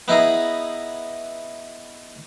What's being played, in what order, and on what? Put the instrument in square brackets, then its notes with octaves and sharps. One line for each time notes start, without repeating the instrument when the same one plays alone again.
[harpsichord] B3 D#4 E4 G#4 A#5